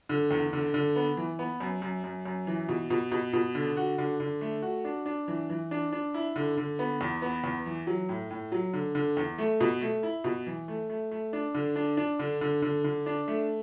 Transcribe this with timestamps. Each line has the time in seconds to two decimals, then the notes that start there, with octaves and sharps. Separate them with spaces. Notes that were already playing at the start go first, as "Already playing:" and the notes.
0.09 D3
0.31 E2
0.53 D3
0.74 D3
0.96 B3
1.17 E3
1.39 B3
1.60 F#2
1.82 F#2
2.04 F#2
2.25 F#2
2.47 E3
2.69 B2
2.90 B2
3.12 B2
3.33 B2
3.55 D3
3.77 F#4
3.98 D3
4.20 D3
4.41 A3
4.62 F#4
4.85 D4
5.06 D4
5.28 E3
5.50 E3
5.71 D4
5.93 D4
6.14 E4
6.36 D3
6.57 D3
6.79 B3
7.01 E2
7.22 B3
7.44 E2
7.66 E3
7.87 F#3
8.09 A2
8.30 A2
8.52 F#3
8.73 D3
8.95 D3
9.17 E2
9.38 A3
9.61 B2
9.81 A3
10.03 E4
10.24 B2
10.47 E3
10.68 A3
10.90 A3
11.11 A3
11.33 D4
11.54 D3
11.76 D4
11.97 D4
12.19 D3
12.41 D3
12.62 D3
12.84 D3
13.06 D4
13.28 A3